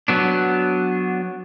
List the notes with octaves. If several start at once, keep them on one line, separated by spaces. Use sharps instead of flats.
F#3 B3 D4